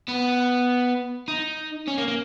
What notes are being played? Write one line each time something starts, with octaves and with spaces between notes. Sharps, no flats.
B3
D#4
C#4
A#3
A#3